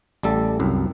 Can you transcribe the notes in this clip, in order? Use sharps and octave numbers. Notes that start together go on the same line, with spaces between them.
A1 G3 A4
C2 F#2